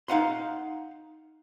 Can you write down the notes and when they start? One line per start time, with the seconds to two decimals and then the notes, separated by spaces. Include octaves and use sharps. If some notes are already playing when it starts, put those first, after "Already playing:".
0.08 D#4 F5 F#5 C6